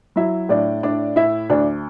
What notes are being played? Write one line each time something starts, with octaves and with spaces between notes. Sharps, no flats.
F#3 E4 E5
A2 D4 D5
A2 D4 D5
A2 E4 E5
D2 D4 D5